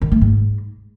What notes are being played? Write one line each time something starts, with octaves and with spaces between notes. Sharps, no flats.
D#3
A3
G#2